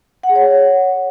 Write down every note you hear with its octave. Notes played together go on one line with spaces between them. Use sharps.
F#5
G#4
C#5